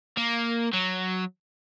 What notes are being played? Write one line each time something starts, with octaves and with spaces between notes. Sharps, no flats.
A#3
F#3